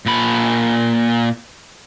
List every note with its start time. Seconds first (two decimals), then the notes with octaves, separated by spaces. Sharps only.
0.06 A#2 B5